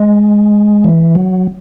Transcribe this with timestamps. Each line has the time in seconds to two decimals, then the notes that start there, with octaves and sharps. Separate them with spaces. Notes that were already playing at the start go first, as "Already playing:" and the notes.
Already playing: G#3
0.84 E3
1.15 F#3